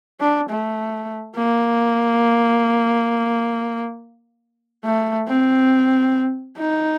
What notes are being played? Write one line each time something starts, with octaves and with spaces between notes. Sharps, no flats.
D4
A3
A#3
A3
C4
D#4